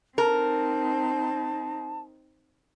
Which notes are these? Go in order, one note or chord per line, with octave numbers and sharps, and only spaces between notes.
C4 D#4 A#4 A5